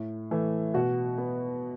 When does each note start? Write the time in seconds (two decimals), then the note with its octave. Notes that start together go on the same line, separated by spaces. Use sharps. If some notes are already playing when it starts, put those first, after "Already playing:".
Already playing: A2
0.31 E3 A3
0.74 B2 F#4
1.18 B3